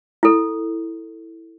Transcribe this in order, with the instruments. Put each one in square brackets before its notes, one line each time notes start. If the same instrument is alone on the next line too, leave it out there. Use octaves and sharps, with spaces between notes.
[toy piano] E4 A4